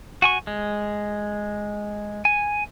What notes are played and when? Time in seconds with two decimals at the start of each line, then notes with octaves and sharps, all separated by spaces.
0.22 F#4 G#5 C#6
0.47 G#3
2.25 G#5